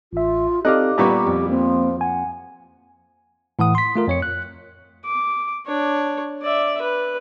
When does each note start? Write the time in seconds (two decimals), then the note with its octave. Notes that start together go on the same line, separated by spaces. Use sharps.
0.13 A1 F4 E5
0.65 C4 D#4 G4 A4 D5 D#5 F5 F#6
0.98 A#2 G3 B3 A#5 C#6
1.27 F2
1.49 F3 A#3 C4
2.01 F#5 G#5
3.59 A2 E3 F#5 D#6
3.75 C6 B6
3.95 A3 F4 A#4
4.07 F2 C#5 C#7
4.22 F#6
5.05 D6
5.66 D4 C#5
6.42 D5 E5
6.82 B4